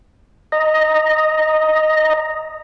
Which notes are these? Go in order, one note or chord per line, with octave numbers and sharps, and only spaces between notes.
D#5 A#5